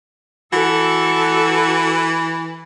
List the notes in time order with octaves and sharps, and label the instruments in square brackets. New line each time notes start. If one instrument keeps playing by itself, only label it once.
[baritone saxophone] E3 [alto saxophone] F#4 [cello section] A4